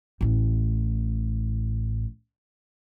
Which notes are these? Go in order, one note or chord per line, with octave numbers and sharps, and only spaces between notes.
A1 A2